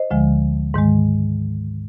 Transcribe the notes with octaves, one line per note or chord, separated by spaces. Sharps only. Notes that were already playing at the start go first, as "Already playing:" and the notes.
Already playing: C5 D#5
D2 D3 F3 G#3
G#2 D#3 G#3